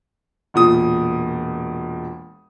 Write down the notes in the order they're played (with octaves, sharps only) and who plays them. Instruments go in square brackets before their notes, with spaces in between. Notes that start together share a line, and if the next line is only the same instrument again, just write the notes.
[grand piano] E1 A#2 D#6